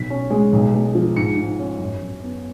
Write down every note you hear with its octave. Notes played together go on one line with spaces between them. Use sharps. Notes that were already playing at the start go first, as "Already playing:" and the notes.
Already playing: B1 B6
C#4
G#3
B1
G#3
F3
G#2 C#7
G#2
C#4
F#2
F#2
B3